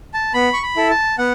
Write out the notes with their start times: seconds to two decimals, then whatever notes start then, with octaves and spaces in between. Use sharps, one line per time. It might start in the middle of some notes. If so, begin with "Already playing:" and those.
0.14 A5
0.34 B3 B5
0.53 C#6
0.63 B5
0.76 E4 A4
0.90 A5
1.18 B3 F#5